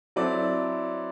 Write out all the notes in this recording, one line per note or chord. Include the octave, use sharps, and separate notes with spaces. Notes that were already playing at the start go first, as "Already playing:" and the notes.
F#3 C4 E4 A4 D5